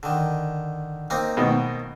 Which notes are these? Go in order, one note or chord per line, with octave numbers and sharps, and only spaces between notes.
D3 D#3
A#3 C4 D#4
B2 D#3